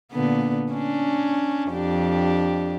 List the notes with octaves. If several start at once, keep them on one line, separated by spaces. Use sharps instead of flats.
A#2 D3 B3
C#4 D4
F2 D4 G4